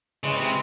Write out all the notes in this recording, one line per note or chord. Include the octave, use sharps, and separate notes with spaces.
C#3 E3 G#3
C3